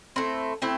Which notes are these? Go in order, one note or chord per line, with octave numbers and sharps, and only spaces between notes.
A3 C4 E4
A3 C4 E4